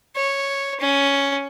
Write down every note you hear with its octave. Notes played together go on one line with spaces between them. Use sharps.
C#5
C#4